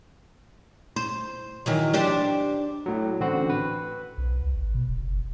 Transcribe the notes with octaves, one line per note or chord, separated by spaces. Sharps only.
C5
D#3 E3 F#3
D4 G4 C5
A2 F#3
A1 D3 C4 F#4
B4
B1
C#2
G#1
B2
D#1
F#1